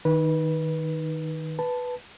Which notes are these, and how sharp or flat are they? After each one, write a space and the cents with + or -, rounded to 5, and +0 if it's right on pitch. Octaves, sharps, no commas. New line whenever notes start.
D#3 +5 D#4 +0 B4 -20
B4 +0 A5 +0